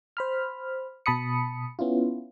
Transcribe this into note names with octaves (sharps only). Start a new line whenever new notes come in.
C5 B5 F6
B2 A5 B5 D#6 C#7
B3 C#4 E4 F4